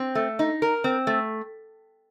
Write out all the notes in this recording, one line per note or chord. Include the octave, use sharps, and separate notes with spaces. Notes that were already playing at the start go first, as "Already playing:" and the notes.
Already playing: C4
A3
D#4
A#4
C4
A3